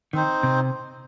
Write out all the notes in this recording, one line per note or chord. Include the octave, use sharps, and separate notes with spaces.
D#3 C4 D#4 C5
C3